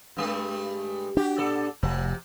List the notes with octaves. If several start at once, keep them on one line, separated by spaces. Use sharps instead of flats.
G2 G#3 A3
D4 F#4 G4
A#2 A4 D5
F1 C3 F3